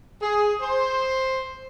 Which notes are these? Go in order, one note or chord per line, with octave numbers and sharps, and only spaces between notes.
G#4
C5